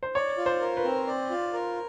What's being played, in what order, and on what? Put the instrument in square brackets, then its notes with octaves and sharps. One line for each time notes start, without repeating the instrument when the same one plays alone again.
[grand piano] C5
[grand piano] C#5 [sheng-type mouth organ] D5
[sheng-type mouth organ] F4
[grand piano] C5
[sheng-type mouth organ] A#4
[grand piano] B4
[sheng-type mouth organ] C4
D5
F4
A#4